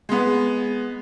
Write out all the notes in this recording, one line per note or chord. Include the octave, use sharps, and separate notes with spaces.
G#3 B3